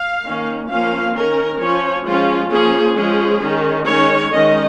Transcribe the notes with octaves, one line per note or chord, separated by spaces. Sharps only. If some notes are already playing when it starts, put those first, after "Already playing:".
Already playing: F5
D#3 A#3 C#4
F3 A#3 C#4 F5
D#3 C#4 A#4
F3 C#4 C#5
F3 G#3 C#4 F4
F3 A#3 C#4 G#4
F3 G#3 C#4 G#4
D#3 C#4
D#3 G#3 C#4 C#5
D#3 G#3 C#4 D#5